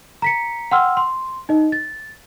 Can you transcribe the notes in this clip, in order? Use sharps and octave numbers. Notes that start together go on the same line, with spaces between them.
A#5 B6 C#7
F#5 G5 C6 E6 F6
C6
D#4 D#5
A6